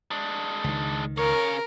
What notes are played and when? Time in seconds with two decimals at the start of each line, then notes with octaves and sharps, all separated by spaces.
0.11 G#3 D4
0.64 C#2 D#3
1.18 C#3 A#4 C#5